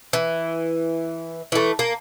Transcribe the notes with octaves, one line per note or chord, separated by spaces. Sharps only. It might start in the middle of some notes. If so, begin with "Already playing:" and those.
E3
E3 A3
A#3